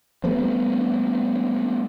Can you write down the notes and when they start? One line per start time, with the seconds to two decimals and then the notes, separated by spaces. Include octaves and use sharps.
0.24 G3 A3 B3 C4